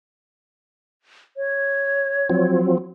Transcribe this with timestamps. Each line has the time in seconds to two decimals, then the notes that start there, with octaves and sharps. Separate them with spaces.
1.37 C#5
2.29 F3 F#3 C4